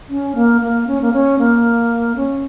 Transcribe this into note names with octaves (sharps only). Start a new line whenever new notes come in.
C#4
A#3
A#3
C#4
A#3
C#4
A#3
C#4